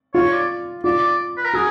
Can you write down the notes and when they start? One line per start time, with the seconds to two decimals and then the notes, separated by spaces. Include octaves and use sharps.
0.14 F4 C#5
0.32 D5
0.84 F4 D5
1.37 B4
1.45 A#4
1.53 F#4 G#4